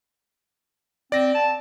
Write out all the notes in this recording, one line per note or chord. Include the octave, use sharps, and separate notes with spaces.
C4 D5 A#6
A5